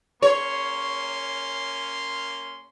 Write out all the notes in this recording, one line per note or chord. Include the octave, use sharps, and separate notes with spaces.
A#3 C#4 C#5 C6